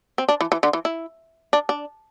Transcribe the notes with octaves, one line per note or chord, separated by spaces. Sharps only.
C4
D4
E3
E3
D3
E3
E4
D4
D4